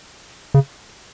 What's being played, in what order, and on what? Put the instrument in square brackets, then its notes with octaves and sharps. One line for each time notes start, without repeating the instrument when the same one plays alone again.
[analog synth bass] C#3